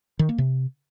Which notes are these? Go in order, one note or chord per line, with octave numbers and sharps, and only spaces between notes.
D#3
A#3
C3